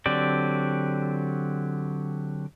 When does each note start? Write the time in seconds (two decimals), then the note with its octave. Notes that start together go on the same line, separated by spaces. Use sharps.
0.06 D3 F#3 C4 G4 D5